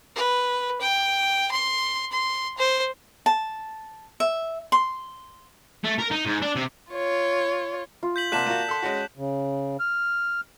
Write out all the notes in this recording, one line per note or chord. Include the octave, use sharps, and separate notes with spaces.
B4
G5
C6
C6
C5
A5
E5
C6
A3
A#4
D#4
G#2
D4
C3
F4 C#5
F4
G6 B6 F#7
C3 A#3 D5 F#5 A5 F#6 B6 E7
A#3 F4 F#4
A4 C6
G#3 C#4 F#4
C#3
F6